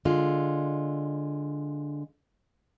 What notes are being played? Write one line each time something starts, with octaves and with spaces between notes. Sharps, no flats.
D3 G#3 F4